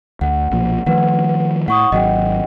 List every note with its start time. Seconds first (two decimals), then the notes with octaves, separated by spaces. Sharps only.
0.21 D2 F#5
0.51 B1 A#2 F3
0.86 D#3 F3 A3 B4 F#5
1.68 A2 F#5 C#6 D#6
1.92 G#1 F#3 D#5 F#5 G5